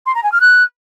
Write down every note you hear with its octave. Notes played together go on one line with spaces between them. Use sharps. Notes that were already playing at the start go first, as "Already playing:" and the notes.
C6
A#5
G#5
F6
F#6